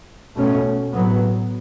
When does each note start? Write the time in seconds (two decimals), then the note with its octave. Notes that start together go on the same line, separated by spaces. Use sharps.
0.36 B2 A3 C#4
0.94 A2 F#3 B3